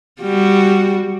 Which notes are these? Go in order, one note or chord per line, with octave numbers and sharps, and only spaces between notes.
G3 F#4